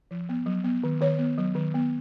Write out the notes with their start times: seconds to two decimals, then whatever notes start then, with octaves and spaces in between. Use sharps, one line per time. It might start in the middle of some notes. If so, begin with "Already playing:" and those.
0.11 F3
0.29 B3
0.46 F#3
0.64 B3
0.84 D#3
1.01 D#3 C#5
1.19 B3
1.38 F#3
1.55 D#3
1.74 B3